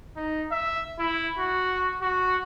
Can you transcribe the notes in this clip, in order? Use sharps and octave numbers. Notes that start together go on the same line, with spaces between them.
D#4
E5
E4
F#4
F#4